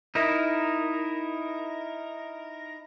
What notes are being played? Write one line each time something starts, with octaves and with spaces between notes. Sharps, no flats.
D#4 E4 A#4